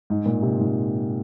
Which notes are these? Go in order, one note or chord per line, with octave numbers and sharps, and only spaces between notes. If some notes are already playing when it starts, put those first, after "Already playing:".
G#2
A#2
C3
G#2